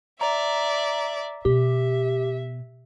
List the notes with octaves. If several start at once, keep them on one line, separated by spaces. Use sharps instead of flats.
D5 E5 A#5
B2 G4 E5